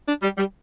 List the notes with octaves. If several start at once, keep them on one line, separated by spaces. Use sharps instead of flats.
D4
G3
G3